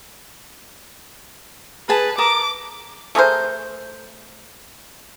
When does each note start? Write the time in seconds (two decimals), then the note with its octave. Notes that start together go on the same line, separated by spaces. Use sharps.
1.89 G#4 B4 A5
2.18 A#4 A5 D6 D#6
3.15 A3 G#4 A#4 C5